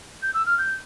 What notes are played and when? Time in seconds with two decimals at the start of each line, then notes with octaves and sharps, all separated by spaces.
0.23 G6
0.34 E6
0.46 F6
0.58 G6